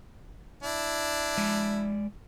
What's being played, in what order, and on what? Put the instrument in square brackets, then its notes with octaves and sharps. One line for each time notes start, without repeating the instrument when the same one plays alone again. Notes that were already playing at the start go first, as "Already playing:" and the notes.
[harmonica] D4 E4
[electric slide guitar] G#3 D5